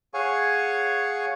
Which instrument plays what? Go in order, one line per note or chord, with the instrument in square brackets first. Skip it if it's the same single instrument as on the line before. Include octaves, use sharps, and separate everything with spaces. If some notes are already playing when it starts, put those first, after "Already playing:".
[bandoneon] G#4 C#5 F5 F#5 G#5 C#6